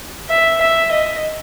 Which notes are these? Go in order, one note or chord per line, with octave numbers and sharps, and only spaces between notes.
E5
E5
D#5